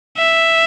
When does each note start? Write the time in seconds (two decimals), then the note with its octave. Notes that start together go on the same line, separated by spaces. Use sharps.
0.17 E5